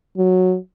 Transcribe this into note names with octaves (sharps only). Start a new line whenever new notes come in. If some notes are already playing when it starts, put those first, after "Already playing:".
F#3